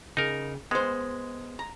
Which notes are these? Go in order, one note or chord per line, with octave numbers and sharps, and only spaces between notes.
C#3 D#4 A#4
G#3 B3 C5
A#5